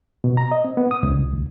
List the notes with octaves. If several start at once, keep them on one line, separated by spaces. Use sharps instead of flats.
B2
A#5
D#5
C4
B3
D#6
C#2
C2
D2